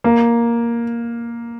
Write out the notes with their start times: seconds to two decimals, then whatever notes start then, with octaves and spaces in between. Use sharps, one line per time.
0.04 A#3